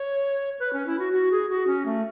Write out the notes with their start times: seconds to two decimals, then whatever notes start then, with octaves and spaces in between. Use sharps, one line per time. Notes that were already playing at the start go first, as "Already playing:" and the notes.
Already playing: C#5
0.59 B4
0.73 C#4
0.87 E4
0.99 F#4
1.13 F#4
1.32 G#4
1.50 F#4
1.67 C#4
1.86 A3